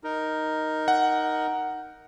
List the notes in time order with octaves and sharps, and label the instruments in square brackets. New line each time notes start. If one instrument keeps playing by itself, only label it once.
[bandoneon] D#4 A#4
[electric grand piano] F#5